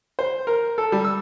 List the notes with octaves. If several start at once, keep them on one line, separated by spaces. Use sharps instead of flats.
C5
A#4
A4
G3
E6